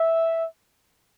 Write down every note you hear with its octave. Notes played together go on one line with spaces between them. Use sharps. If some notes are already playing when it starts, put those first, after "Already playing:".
Already playing: E5